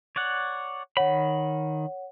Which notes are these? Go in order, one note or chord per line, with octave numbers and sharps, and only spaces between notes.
C#5 D5 F#5
D#3 C#5 F#5 B5